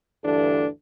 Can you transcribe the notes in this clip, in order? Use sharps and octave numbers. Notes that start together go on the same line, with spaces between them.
D2 G2 E3 D4 A4